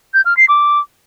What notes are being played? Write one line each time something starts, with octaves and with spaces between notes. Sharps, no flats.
G6
F6
C7
D6